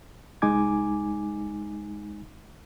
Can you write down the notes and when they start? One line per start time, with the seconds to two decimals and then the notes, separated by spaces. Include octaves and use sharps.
0.42 C2 G#3 D#4 G#5 D6 G#6